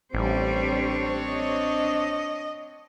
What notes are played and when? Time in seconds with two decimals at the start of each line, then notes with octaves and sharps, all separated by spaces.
0.14 A1 G3 C4 D4 C5 C#5
1.29 D#5